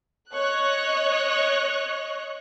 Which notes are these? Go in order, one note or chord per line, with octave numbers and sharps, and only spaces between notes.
C#5 D#5 C#6 F#6